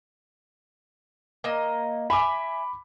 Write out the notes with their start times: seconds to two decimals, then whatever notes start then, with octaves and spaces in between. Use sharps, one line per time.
1.44 A#3 D#5
2.10 E5 G#5 B5 D6